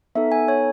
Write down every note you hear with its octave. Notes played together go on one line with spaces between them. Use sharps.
B3 D#4 A4 E5
G#5
C#5